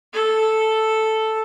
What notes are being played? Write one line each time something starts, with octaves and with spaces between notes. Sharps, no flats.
A4